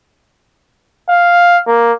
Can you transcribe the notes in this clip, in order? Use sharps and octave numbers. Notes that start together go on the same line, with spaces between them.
F5
A#3